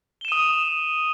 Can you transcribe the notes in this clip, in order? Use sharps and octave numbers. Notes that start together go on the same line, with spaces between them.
D#6 D#7 E7 G7